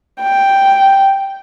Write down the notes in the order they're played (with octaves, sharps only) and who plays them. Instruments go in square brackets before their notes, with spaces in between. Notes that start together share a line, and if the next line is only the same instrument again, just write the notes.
[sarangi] G5